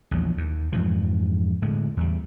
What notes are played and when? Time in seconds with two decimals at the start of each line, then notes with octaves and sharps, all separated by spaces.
0.11 A#1 E2 F#3
0.37 D#2
0.72 F2 G#2 E3 F3
1.62 A2 D3 G#3
1.97 E2 G3